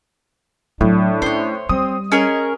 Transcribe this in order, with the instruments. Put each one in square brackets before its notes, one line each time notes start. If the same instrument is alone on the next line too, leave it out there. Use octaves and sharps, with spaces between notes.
[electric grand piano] A2 [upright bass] F#3 F4 [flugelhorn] D4
[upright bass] C#4 [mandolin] C5 C#5
[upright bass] G3 [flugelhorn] C4 [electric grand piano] D#6
[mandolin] C#4 G#4 A#4 [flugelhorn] D#5